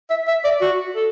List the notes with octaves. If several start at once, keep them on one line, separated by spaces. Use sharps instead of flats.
E5
E5
D5
F#4
A4